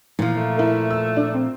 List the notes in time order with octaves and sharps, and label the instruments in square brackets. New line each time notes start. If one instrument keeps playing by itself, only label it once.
[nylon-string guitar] A#2 F3 [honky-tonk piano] E3
[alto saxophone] A3
[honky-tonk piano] E4 A#4
E6
D4
C4